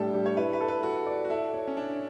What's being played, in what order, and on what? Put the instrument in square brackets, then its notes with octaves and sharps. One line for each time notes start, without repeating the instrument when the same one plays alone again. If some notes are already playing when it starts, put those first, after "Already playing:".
Already playing: [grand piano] A2 G3 D4 [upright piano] G4 A4
[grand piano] G3
[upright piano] C#5
[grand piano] E4 [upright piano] B4
[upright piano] B4
[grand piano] A4
[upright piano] B4
[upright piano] F#4 [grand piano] A4
[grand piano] D5
[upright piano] F#4
[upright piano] E4 [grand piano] A4
[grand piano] C#5
[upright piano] C#4
[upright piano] D4 [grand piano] C#5